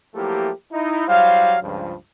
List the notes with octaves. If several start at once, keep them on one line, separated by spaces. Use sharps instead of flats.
F3 F#3 A3 A#3 E4 G4
D#4 E4
F#3 G3 E4 C5 F5
C#2 G2 F3